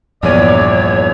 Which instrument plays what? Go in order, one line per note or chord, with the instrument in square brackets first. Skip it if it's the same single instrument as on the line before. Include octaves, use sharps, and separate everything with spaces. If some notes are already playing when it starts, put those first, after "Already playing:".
[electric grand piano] A#1 E2 D#7 [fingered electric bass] G2 [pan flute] C#5 [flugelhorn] D5